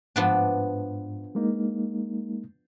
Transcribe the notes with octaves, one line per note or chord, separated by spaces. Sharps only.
G#2 F3 B3 D4
G#3 A#3 D#4